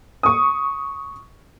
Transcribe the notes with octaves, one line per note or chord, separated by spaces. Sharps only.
C#6 D#6